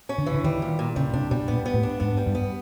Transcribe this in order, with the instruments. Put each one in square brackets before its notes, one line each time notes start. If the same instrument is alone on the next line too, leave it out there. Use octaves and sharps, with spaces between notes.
[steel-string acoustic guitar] C#4
[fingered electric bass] D3
[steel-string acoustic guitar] E3
[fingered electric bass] D3
[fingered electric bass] D#3 [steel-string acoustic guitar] G3
[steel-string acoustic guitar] A#2
A#2
[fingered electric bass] C#3 [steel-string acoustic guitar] G3
[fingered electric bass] C3 [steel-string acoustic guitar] D4
[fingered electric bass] B2 [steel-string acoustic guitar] G3
[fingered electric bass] A#2 [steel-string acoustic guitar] B3
[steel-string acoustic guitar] B3
[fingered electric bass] A2
[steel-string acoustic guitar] D4
[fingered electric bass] G#2 [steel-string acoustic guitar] B3
[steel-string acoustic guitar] G3
[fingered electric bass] G2
[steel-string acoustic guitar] B3